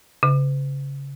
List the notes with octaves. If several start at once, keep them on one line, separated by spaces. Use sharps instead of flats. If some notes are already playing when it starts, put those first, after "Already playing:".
C#3